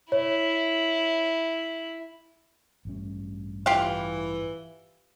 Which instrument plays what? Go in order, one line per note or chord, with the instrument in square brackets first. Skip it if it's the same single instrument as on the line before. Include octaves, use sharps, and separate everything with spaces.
[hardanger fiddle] E4 [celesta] C#5
[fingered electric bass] A1 G2 C#4
[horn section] E3 [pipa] F4 G4 F5